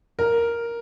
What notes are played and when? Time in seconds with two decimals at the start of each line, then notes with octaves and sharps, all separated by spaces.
0.19 A#4